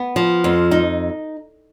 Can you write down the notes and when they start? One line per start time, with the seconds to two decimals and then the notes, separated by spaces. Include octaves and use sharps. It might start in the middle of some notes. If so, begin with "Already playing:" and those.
Already playing: B3
0.16 F3
0.44 F2
0.71 D#4